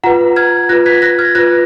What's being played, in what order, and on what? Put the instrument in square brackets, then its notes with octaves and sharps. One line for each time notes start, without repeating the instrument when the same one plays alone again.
[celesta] F4 B4 F#5 A#5
F6 G#6
F4 B4 F#6 A#6
G#6 B6
F#6 A#6
F6 G#6
F4 B4 F#6 A#6